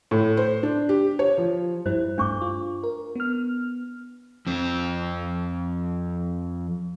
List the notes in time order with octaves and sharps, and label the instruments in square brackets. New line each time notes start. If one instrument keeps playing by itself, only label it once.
[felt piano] A2
C5
D4
G4
C#5
F3
[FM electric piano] G2 G3 E4 [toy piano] C5
[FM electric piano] G2 A3 [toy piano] D4 C#6 D6
[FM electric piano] F4
A#4
B3 F6
[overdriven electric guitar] F2 C4